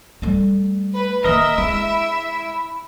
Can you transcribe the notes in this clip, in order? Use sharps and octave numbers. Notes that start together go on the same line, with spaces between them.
G3 A3
B4
D#3 A#3 A#4 D#5 E5
G#3 E4